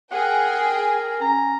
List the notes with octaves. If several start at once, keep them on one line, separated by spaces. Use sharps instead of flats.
G#4 A#4 F#5 G5
C#4 A#5